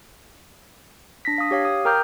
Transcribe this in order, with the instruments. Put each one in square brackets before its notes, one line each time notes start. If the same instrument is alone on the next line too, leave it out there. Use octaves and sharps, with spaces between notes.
[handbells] D4 A#6 B6
F5 D#6
G4 C#5 F5
D#6
A#4 G5 A#5 D6 F6 G6